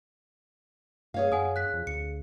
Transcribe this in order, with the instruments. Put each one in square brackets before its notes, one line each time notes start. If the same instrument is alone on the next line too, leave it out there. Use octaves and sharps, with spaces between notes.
[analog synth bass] G2 [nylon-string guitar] G#4 C#5 F5
[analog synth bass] F#2 [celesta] F#5 G#5 D#6
[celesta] F#6 B6
[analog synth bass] F2
[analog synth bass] D2 [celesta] C#7